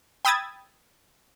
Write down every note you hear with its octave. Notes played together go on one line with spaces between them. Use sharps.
G5 B5 D#6 E6 G#6 A6